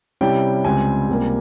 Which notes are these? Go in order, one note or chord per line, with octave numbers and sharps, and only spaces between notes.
C3 G3 C#4 E4 G5
C#2 C#3 G3 C4 G#5
C#2 C3 G3 A#3